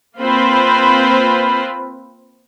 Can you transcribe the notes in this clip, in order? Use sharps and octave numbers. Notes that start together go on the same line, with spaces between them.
A#3 C4 F4 B4 C5 B5